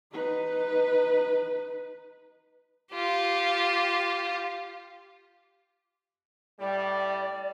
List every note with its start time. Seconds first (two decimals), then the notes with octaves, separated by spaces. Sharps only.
0.12 D#4 B4
2.92 F4 G4
6.60 A2 G3 D5